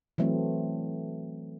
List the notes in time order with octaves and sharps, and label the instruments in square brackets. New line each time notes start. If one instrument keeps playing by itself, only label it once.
[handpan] E3 F#3 A3 C4